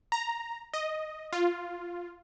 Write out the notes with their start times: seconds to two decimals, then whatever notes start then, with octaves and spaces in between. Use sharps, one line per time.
0.12 A#5
0.74 D#5
1.33 F4